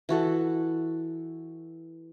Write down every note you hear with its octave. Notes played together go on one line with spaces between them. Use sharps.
E3 F#4 A4